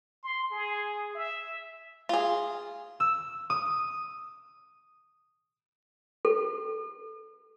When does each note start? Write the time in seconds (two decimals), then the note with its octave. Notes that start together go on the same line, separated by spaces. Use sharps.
0.23 C6
0.52 G#4
1.15 E5
2.09 F4 G#4
3.00 E6
3.50 D#6
6.25 A4